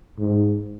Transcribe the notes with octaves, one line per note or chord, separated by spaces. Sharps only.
G#2